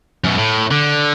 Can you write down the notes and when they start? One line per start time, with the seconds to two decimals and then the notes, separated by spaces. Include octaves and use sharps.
0.24 F#2 B2
0.37 A2
0.71 D3